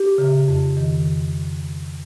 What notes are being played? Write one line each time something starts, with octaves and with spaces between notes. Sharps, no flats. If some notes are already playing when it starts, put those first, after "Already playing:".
Already playing: G4
C#3
F2
D#3